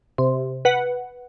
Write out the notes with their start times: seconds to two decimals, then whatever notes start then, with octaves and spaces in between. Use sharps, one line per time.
0.18 C3
0.65 B4 F#5